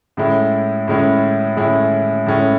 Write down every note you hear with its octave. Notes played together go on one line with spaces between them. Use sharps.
A2 G#3 C#4 E4
A2 G#3 C#4 E4
A2 G#3 C#4 E4
A2 G#3 C#4 E4